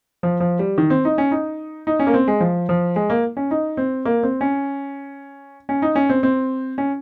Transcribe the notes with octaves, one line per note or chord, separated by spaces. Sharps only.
F3
F3
G3
D#3
C4
D#4
C#4
D#4
D#4
C#4
A#3
C4
G#3
F3
F3
G#3
A#3
C#4
D#4
C4
A#3
C4
C#4
C#4
D#4
C#4
C4
C4
C#4